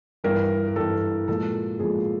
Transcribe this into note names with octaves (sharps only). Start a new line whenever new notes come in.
G2 E3 G3 A#4
A#4
G2 E3 G3 A4
A#2 F3 G#3 A4
A#2 F3 G#3 G#4